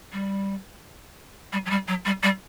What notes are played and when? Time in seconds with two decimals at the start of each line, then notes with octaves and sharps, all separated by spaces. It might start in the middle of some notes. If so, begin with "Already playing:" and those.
0.13 G3
1.53 G3
1.66 F#3
1.70 G3
1.88 F#3
2.05 G3
2.23 G3